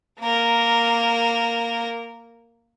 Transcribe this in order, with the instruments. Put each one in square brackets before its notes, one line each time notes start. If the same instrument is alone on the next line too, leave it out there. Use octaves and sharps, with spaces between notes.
[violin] A#3 A#4